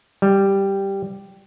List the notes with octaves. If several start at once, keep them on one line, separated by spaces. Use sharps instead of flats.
G3